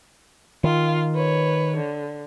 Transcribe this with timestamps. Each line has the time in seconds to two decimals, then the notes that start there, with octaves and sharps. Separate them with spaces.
0.64 D#3 F4
1.14 B4 C#5
1.76 D3